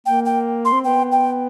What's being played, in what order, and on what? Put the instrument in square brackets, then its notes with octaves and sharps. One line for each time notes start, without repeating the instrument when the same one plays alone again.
[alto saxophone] A#3 [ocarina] G5
[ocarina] G5
C6
[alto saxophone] C4
[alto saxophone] B3 [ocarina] G5
[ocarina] G5